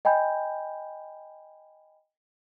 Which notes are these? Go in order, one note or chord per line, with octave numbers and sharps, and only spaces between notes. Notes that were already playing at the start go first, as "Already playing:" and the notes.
D#5 G5 G#5 B5 G6